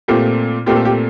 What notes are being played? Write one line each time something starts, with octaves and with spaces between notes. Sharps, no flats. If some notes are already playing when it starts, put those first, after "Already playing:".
A#2 A3 C4 F4 G4
A#2 A3 C4 F4 G4
A4
G4